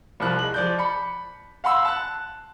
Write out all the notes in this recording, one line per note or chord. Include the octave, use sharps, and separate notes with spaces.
C2 F3 F#6
G#3 F#7
F3 D5 G6
B5 C#7
F5 F#5 B5 C6 E6
A5 F#6